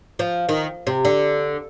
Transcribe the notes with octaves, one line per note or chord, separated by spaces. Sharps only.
F3
D#3
C3
D3